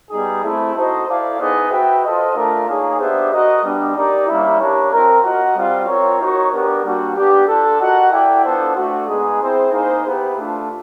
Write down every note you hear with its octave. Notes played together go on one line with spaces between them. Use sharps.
G3 B3 D#4 G#4
A3 C4 E4
D#4 F#4 A4 C5 D#5
E4 A4 D5 F5
B3 D#4 G#4 C5 D#5
F#4 B4 E5 G5
F4 A4 C5 D#5
A3 D4 F4 A#4
A#3 D#4 G#4 C#5
B3 D4 G4 C5 E5
F#4 A#4 D#5
G3 B3 D4
D#4 G4 A#4 D5
G3 A#3 C#4 E4
D4 G4 A#4 C#5
C4 F4 A#4
F#4 A#4 D#5 F#5
G3 C4 F4
C4 F4 A#4 C#5
D#4 F#4 A#4 C#5
B3 D4 G4 A#4
G3 A#3 D4 F#4
B3 D4 G4
D4 F4 A4
F#4 A#4 D#5 F#5
E4 A4 D5 G5
B3 D4 F4 A4 C5
A3 D4 F#4
G#3 B3 D#4 G#4
C4 E4 G#4 C5
A#3 D#4 G#4 C5
B3 E4 G4
A3 D4 F4